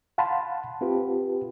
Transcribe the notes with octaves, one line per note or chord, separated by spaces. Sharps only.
F5 F#5 A5 B5 C6
C4 F4 G4 B4